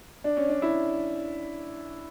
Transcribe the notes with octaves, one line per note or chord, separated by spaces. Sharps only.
D4
C#4
D4
E4